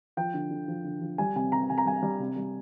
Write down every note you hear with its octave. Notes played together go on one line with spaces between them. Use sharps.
F3 G5
D3
D3
F3
D3
F3
G3 G#5
C3 G#5
C3 A#5
C3 G#5
A#5
G3 G#5
G3
C3
G3